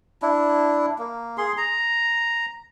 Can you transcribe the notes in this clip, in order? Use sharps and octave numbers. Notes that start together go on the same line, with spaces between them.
D4 E4
A#3
G#4 C6
A#5